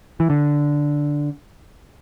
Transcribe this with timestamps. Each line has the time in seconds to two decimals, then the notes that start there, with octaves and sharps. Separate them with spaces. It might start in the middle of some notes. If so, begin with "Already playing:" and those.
0.20 E3
0.30 D3